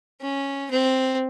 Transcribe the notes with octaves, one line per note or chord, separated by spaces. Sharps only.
C#4
C4